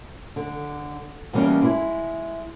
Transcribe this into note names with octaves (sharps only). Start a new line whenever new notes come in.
D3
B2 E3 G3 A#3 B3 C#4
G#3 E4